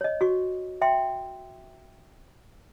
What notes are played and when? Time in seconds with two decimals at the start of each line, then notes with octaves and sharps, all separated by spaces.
0.01 C#5 D#5
0.21 F#4 C#6
0.82 E5 G5 C6